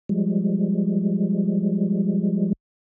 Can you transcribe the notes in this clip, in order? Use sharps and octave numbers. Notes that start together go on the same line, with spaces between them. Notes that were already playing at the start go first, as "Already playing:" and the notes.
F3 G3 G#3